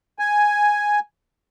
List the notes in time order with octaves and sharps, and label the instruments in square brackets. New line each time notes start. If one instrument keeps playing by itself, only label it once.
[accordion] G#5